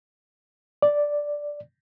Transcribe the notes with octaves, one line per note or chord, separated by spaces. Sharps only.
D5